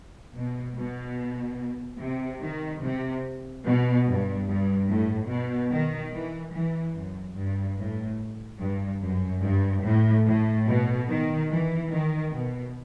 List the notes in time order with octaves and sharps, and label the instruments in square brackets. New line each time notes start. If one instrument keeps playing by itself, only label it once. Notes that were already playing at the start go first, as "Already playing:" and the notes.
[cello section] B2
B2
C3
D#3
C3
B2
G2
G2
A2
B2
D#3
E3
E3
F#2
G2
A2
G2
F#2
G2
A2
A2
B2
D#3
E3
D#3
B2